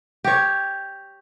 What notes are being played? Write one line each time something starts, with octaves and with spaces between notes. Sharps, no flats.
G4 C#5